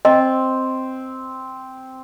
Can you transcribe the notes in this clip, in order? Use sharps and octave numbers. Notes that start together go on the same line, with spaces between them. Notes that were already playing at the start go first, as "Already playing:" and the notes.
C4 D#5